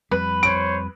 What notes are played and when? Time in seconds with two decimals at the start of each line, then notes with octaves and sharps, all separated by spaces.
0.11 F2 G3 B4
0.43 C5 C#5 D7